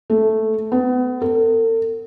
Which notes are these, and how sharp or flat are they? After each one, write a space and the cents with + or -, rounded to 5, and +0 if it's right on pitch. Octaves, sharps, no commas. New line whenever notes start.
A3 -5
B3 +30
A4 +45